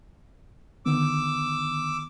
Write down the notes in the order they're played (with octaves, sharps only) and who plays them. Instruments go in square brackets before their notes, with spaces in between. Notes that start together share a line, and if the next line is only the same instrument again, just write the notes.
[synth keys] D3 D#3 B3 [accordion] D6 E6